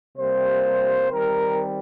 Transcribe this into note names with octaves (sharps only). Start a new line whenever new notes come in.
C3 G3 A#3 C5
D#3 G3 C4 A#4